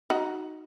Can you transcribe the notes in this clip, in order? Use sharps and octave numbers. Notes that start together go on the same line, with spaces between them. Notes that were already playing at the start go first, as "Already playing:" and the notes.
D#4 F#4